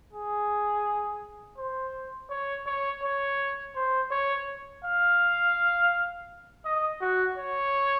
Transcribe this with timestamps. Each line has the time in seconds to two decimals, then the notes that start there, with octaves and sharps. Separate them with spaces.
0.13 G#4
1.58 C5
2.30 C#5
2.67 C#5
3.03 C#5
3.76 C5
4.11 C#5
4.84 F5
6.65 D#5
7.01 F#4
7.38 C#5